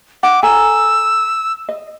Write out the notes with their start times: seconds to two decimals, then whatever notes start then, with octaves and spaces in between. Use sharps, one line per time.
0.23 F#5 D6
0.43 A4 G#5 A#5 E6
1.69 D#5